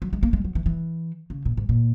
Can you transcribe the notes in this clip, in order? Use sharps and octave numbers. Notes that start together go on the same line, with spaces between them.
F#3
G#3
A#3
G#3
F#3
E3
E3
C#3
A#2
G#2
A#2